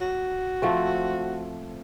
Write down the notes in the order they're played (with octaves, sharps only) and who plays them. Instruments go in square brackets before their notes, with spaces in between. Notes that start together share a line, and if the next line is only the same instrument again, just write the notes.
[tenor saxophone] F#4
[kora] F3 A3 C4